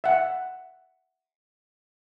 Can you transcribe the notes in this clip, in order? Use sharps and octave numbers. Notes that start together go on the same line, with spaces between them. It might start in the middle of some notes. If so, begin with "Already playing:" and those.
E5 F#5